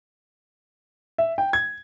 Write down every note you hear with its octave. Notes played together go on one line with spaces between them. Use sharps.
E5
G5
G#6